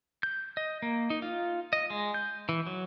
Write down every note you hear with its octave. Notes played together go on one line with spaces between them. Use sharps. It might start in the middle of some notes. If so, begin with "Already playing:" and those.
G6
D#5
A#3
D#4
F4
D#5
G#3
G6
E3
F#3